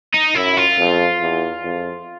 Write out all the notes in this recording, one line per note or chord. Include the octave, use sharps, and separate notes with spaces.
D#4
F#2 E4
F4
F2
E2
F2